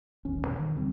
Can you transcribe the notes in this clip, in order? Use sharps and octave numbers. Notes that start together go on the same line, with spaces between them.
D#1 A1 D#2 C#4
B2
D#3
D2 C3 G3 C4